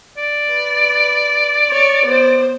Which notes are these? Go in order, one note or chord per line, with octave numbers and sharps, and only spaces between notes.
D5
B4
C#5
B3 C5